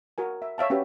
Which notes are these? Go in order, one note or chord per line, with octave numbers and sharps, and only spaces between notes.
F#4 A#4 G#5
E5
C#5 E5 F5 A5
C#4 F#4 G4 B4